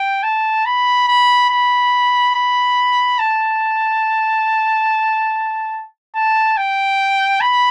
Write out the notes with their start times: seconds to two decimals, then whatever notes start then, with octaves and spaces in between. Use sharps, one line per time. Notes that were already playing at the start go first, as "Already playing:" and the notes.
Already playing: G5
0.23 A5
0.65 B5
1.08 B5
1.50 B5
2.34 B5
3.19 A5
6.15 A5
6.57 G5
7.40 B5